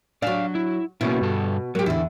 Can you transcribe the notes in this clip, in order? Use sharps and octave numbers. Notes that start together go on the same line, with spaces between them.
F#3 D4 D5 F5
E4
B2 A#3 C#4 E4
G2 A4
F#3 A#3 G4
E2 D3 E4